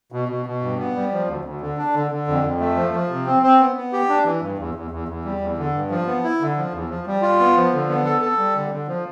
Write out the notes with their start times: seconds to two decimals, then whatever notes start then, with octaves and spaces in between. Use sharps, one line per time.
0.12 B2
0.29 B2
0.46 B2
0.62 G2
0.78 B3
0.96 G3
1.12 F3
1.28 D2
1.45 D2
1.61 D3
1.77 D4
1.94 D3
2.11 D3
2.28 F2
2.43 F2
2.60 A3
2.77 F3
2.94 F3
3.09 C3
3.26 C4
3.43 C4
3.59 B3
3.76 B3
3.93 G4
4.09 D4
4.25 E3
4.42 G2
4.59 E2
4.75 E2
4.91 E2
5.08 E2
5.25 G3
5.41 E2
5.58 D3
5.74 G2
5.90 F3
6.06 B3
6.23 E4
6.41 D3
6.57 F3
6.73 E2
6.89 F3
7.07 G3
7.22 F4
7.40 B3
7.56 F3
7.73 D3
7.89 B3
8.05 A4
8.21 A4
8.38 G3
8.55 D3
8.71 D3
8.88 F3